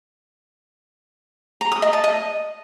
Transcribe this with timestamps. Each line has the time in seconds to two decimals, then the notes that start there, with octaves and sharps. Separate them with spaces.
1.61 A#5
1.72 D#6
1.82 D#5
1.93 A5
2.04 D#5